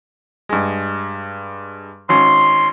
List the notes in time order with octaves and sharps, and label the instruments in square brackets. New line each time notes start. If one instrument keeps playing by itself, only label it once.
[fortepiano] G2 G#3
[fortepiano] G#1 C#4 [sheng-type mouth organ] C6